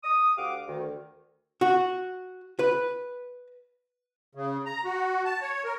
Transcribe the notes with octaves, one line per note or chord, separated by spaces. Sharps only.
D#6
D2 G4 F5 F#5 D6
D2 D#3
F#4
B4
C#3
A#5
F#4
A5
C#5
A#4